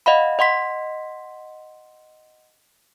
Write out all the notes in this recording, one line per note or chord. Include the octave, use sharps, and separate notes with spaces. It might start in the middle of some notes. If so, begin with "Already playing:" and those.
D#5 F5 F#5 B5
D#5 F#5 C6 B6